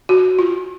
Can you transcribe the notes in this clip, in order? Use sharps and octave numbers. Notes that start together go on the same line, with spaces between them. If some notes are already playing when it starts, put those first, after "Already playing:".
F#4
F4